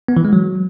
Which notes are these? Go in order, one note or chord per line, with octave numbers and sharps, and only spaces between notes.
B3
E3
G#3
F#3